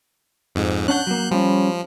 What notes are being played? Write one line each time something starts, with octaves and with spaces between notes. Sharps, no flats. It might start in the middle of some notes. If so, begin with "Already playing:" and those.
F2 G#2
C#4 D4 F#5 F#6 G6
F#3 A#3
F3 G3 C#4